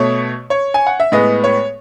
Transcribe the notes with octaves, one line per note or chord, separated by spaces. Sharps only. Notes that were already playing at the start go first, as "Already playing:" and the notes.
Already playing: B2 A3 C#5
C#5
G#5
F#5
E5
A2 G#3 B3 D#5
C#5